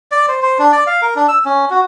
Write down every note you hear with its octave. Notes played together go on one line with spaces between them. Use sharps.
D5
C5
C5
D4
D5
F5
A#4
D4
E6
C#4
F#4